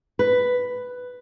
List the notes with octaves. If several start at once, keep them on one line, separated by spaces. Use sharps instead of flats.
B4